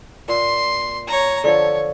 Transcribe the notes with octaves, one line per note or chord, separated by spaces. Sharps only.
A#2 C6
C#5 A#5
D3 F3 A4 C#5